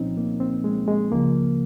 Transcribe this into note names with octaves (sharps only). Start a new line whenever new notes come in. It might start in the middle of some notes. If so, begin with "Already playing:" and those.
Already playing: C2 A#2 F3 C4 C#4 D#4
A#3
C4
G#3
G#3
C#2 C#3 F3 A#3